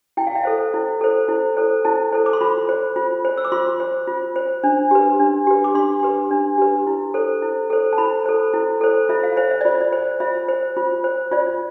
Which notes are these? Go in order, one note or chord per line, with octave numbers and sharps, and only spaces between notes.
E4 G5
F5
E5
A4 C5 F5
E4
A4 C5
E4
A4 C5
E4 A5
A4 C5
D6
C6
F4 B5
C5
F4
C5
E6
D6
F4 C6
C5
F4
C5
D4
G4 B4
D4
G4 B4
D6
D4 C6
G4 B4
D4
G4 B4
E4
A4 C5
E4
A4 C5
A5
E4 B5
A4 C5
E4
A4 C5
F4 E5
F5
C5 E5
E5
F4 D5
D5
C5
F4 E5
C5
F4
C5
F4 D5